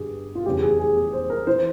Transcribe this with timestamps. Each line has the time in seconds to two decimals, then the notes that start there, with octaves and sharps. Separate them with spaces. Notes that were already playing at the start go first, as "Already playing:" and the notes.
Already playing: G1 G2 G4 G#4
0.35 F4
0.46 F1 E2 C#3 G4
0.63 G#4
0.79 G#4
0.97 G#4
1.13 C5
1.30 A#4
1.47 E3 C5